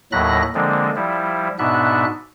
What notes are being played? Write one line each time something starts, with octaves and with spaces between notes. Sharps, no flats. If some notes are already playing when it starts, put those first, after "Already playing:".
D#2 A2 F#3 B5 F#6 A#6
D3 F3 G#3 A#3 C4 D4
F3 G3 E4
G#2 B2 B3 D4 E5 F#6